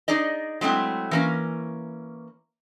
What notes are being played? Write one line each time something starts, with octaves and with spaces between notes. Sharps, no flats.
D#4 G#4 D5 D#5
F#3 G#3 A3 C4 E4
E3 A#3 C#4